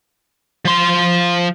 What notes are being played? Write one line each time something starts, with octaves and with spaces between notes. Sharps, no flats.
F3 C6